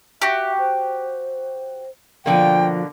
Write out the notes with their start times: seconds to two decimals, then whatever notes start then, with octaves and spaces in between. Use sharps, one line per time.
0.22 F#4 G4 E5
0.59 C5
2.26 B2 D3 F3 A#3 G5